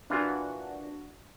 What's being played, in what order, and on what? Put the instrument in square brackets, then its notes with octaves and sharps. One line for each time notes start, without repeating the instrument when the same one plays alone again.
[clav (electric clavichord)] A#2 E3 F4 [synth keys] D4 F#4